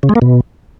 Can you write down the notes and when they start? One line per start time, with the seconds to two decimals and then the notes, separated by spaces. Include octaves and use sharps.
0.03 C#3
0.09 G#3
0.15 A#3
0.22 B2